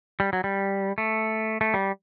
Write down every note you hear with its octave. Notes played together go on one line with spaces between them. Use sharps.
G3
F#3
G3
A3
A3
G3